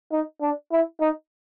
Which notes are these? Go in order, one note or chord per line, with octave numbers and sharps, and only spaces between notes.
D#4
D4
E4
D#4